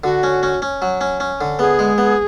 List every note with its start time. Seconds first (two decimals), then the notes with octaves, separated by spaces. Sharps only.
0.04 D3 F#4
0.23 C#4
0.43 C#4
0.62 C#4
0.82 F#3
1.01 C#4
1.20 C#4
1.41 D3
1.59 B3 G#4
1.79 G#3
1.98 B3